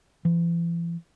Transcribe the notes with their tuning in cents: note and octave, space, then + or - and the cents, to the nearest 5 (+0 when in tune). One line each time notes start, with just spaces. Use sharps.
E3 +45